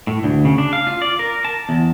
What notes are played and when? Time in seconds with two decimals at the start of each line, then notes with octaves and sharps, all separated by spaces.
0.07 A2
0.24 D2
0.45 C#3
0.58 D4
0.73 F5
0.87 F4
1.02 D5
1.19 A#4
1.45 A5
1.69 E2